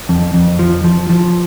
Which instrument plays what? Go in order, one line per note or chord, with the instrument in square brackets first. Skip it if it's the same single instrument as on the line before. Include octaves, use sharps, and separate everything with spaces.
[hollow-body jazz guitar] F2
F2
F3
F3
F3